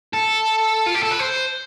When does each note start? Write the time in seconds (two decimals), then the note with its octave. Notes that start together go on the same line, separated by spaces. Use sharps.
0.14 A4
0.87 F4
0.95 G4
1.03 A4
1.11 B4
1.19 C5